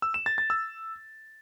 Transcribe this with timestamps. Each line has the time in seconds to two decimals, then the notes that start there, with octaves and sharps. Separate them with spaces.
0.02 E6
0.14 E7
0.26 A6
0.38 A6
0.50 E6